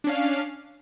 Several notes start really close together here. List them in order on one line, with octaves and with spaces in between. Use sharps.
D4 C#4 F5